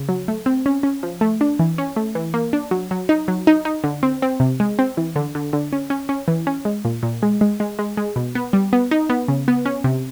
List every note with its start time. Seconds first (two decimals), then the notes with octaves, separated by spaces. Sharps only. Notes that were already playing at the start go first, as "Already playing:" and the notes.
Already playing: C#3
0.09 F#3
0.28 A3
0.46 C4
0.66 C#4
0.83 C#4
1.03 F3
1.21 A3
1.41 D4
1.59 E3
1.78 C#4
1.96 A3
2.15 E3
2.34 A#3
2.53 D4
2.71 F#3
2.91 F#3
3.09 D#4
3.28 F#3
3.47 D#4
3.65 D#4
3.84 D3
4.03 C4
4.22 C4
4.40 C3
4.60 G#3
4.79 C4
4.97 E3
5.16 D3
5.35 D3
5.53 D3
5.73 C#4
5.90 C#4
6.09 C#4
6.28 E3
6.47 C#4
6.65 G#3
6.85 A#2
7.03 A#2
7.23 G#3
7.41 G#3
7.60 G#3
7.79 G#3
7.97 G#3
8.16 B2
8.35 B3
8.53 G3
8.73 B3
8.91 D#4
9.10 B3
9.28 C#3
9.48 B3
9.66 C#4
9.84 C3